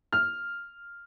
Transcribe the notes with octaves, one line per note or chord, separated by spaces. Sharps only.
F6